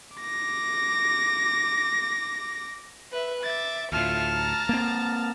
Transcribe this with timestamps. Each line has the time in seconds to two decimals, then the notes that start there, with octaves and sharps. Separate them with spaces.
0.18 D6 A#6
3.12 B4 E5
3.43 E5 D6 A6
3.92 D2 A2 F4 E5 A5 F6
4.35 A#5 A6
4.69 A#3 C4